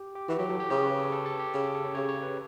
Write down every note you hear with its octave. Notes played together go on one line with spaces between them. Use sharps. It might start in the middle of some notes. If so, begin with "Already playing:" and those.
Already playing: G4
G4
E3 F#4
F#3 G4
F#3 A4
G4
C#3 G4
B4
A4
A4
A4
G4
C#3 G4
A4
A4
C#5
C#3 C#5
C#5
B4